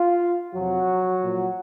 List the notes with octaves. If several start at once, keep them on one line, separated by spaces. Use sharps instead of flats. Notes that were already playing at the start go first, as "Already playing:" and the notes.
Already playing: F4
F2 C3 F3 F#3 F#4
A#2 F3